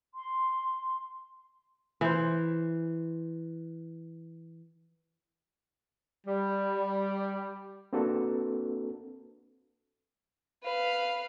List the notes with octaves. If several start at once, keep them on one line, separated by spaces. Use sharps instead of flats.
C6
E3 C5
G3
A#3 C4 D4 F#4 A4 B4
B4 F5